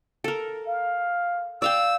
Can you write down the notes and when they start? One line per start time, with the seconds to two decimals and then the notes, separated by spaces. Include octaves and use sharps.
0.24 A4 A#4
0.67 F5
1.62 D5 F5 G5 E6